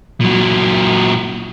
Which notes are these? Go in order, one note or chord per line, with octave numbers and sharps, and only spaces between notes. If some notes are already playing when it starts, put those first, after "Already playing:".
A#2 F#3